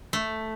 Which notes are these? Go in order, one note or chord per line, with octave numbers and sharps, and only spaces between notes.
A3